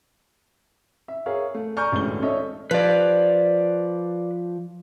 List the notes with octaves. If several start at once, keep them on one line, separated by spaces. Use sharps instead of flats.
E5
G#4 A#4 C#5 E5 F5
A3
D5 G#5 A#5 C#6 F6 G6
A1 D2 G#3 G7
D4 A4 C#5 D#5 E5
F3 B4 D5